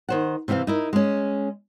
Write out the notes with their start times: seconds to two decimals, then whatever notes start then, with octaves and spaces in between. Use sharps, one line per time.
0.09 D#3 C5 F#5
0.48 C3 E3 C4 E5 F5
0.67 D#4 E4 A#4
0.93 G#3 C#4